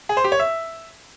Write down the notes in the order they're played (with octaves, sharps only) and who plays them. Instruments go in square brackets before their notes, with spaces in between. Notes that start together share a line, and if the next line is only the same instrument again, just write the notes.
[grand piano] G#4
C5
G4
C#5
E5